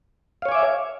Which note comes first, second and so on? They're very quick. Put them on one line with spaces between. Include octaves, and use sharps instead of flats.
F5 C#5 G#5 D6 E5